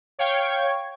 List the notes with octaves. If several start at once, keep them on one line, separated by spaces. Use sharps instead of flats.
C#5 F5 G5 C#6 G#6